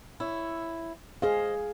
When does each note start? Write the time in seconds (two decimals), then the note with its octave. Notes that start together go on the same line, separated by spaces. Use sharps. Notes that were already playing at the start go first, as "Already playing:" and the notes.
0.20 E4 C#5
1.22 G#4 C5 D#5 F5